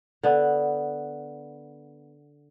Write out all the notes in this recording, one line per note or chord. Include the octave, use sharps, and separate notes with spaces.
D3 B3